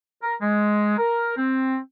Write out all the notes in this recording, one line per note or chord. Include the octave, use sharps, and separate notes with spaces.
A#4
G#3
A#4
C4